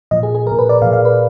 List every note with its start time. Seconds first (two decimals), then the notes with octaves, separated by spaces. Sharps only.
0.11 A#2 F3 D#5
0.23 G#4
0.35 G#4
0.46 F3 A#4
0.51 A#2
0.59 B4
0.69 D5
0.82 A#2 F3 F5
0.93 F5
1.05 B4